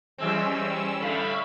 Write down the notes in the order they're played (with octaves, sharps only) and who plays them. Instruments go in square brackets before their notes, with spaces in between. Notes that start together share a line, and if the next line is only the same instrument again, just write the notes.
[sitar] E3 G#3 C4 [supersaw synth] G3 C#4 E6
[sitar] A2 D3 A3 [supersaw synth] E5 F5 B5